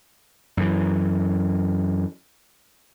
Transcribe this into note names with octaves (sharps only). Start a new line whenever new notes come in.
F#2 E3